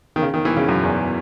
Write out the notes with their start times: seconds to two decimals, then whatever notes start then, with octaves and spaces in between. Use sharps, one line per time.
0.16 D#3
0.22 C#3
0.34 D#3
0.45 E3
0.56 C#3
0.69 F#2
0.83 E2